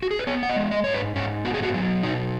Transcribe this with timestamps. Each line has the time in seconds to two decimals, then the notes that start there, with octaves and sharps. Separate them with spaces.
0.02 F#4
0.11 G#4
0.19 B4
0.27 B3 C#5
0.43 F#5
0.49 D#5
0.56 G#3
0.71 D#5
0.84 G#2 C#5
0.93 B4
1.16 G#2 C#4
1.45 B3 F#4
1.54 G#4
1.63 F#4
1.74 F#3
2.03 B2 D#4